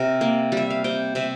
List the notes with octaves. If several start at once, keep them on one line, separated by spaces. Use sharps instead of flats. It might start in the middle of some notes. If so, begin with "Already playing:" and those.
Already playing: C3 A#4
A#3
G3 E5
F5
C3 G5
C3 E5